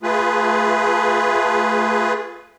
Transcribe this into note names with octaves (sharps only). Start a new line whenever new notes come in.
A3 F4 G#4 B4